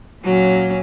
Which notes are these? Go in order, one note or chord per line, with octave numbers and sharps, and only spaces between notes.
A#2 F#3 C#4